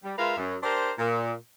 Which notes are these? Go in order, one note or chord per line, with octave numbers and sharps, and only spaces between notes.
G3
G#3 F4 A#4 B4 E5 F5
F#2
D4 G4 A#4 C5
A#2